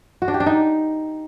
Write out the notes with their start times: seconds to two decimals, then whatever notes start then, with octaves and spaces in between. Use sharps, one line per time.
0.22 F#4
0.28 D4
0.34 G4
0.40 D4
0.46 D#4